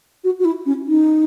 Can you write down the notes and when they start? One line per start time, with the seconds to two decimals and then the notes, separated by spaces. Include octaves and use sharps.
0.24 F#4
0.39 F#4
0.45 E4
0.66 C#4
0.86 D#4